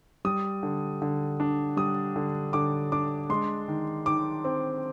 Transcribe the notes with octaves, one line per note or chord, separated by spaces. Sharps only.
G3 D#6
D3
D3
D4
G3 D#6
D3
D3 D6
D4 D6
G#3 C6
D#3
D#3 D6
C4